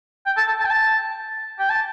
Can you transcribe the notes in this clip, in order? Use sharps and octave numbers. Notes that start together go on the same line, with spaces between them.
G5
A5
A5
A5
G5
A5
G5
A5